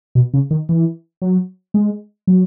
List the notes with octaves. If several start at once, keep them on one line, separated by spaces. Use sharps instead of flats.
B2
C#3
D#3
E3
F#3
G#3
F#3